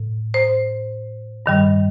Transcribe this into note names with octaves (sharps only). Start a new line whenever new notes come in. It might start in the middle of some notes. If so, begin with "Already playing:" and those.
Already playing: A2
C5
G2 D#3 G3